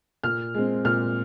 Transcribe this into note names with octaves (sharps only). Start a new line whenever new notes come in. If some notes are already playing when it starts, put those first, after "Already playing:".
A#2 F6
G#3 C4
A#2 F6